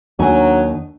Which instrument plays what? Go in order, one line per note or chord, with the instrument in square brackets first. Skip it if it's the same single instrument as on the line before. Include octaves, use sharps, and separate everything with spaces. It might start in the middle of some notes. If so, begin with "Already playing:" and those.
[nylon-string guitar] D#2 D#4 G#5 [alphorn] F#3 [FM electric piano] A3 D4